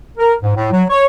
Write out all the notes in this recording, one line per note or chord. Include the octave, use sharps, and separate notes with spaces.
A#4
G#2
A2
F#3
C#5